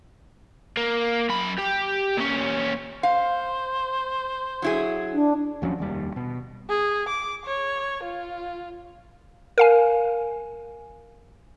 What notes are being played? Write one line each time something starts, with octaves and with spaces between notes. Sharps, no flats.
A#3
F#2 B5
G4
A#2 C#4
C5 F5
F#3 E4 G#4
D4
D#2 F3 F#3 C#4
F1 D#2 G3
B2
G#4
D6
C#5
F4
A#4 F5 G#5